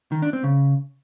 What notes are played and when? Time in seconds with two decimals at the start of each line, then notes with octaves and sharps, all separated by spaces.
0.12 D#3
0.22 D4
0.33 C4
0.44 C#3